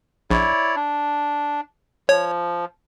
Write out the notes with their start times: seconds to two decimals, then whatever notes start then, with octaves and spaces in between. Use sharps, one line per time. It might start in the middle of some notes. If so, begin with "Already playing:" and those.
0.31 A#1 E4 C#5 D5
0.76 D4
2.09 F3 C#5